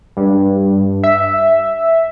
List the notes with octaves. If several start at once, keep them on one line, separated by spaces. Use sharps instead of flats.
G2
E5